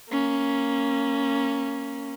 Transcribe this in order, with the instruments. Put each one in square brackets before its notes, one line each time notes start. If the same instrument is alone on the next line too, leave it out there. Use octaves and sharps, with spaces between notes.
[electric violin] A#3 C#4